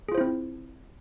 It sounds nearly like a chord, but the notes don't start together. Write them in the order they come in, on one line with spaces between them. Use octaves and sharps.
G#4 F4 C5 E4 C4